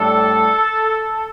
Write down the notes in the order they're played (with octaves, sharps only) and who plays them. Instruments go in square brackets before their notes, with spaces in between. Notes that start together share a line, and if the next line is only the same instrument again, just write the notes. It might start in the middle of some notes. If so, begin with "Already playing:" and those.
Already playing: [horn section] A2 G3 D4 A4